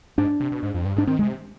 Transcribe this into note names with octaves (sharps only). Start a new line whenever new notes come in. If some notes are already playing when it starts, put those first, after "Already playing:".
G#2 D4
C3
B2
G#2
F2
G2
G#2 D4
D#3 C4
G#3
C3